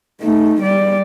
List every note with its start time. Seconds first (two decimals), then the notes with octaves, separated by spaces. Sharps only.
0.21 A3 D#4
0.61 G3 D5